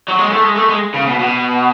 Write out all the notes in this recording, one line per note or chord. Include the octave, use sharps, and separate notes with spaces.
F#3
G#3
A3
G#3
A3
G#3
C#3
B2
B2